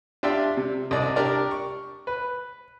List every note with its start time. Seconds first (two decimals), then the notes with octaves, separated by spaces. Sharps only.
0.23 D4 F4 G4 D5 E5 G5
0.57 C3
0.91 C2 D5 D#5
1.16 D4 G4 A#4 D5
1.51 C#6
2.07 B4